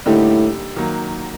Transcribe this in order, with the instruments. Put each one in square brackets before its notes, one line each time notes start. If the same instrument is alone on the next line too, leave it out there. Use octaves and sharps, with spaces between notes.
[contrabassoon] A2 [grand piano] D3 G3 A#3 D#4 G4
[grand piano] D#3 F#3 A#3